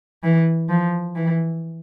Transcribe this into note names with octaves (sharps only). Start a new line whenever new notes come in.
E3
F3
E3